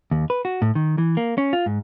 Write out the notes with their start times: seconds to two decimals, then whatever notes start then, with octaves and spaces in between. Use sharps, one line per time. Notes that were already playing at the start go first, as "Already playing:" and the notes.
0.11 D#2
0.30 B4
0.45 F#4
0.62 A2
0.75 D#3
0.98 E3
1.17 A#3
1.38 C#4
1.53 F4
1.66 G#2